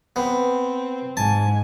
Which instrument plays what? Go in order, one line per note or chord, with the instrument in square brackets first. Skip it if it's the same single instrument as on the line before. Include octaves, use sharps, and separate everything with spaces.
[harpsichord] B3 [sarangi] C4
[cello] G#2 [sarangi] G#5 [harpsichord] A5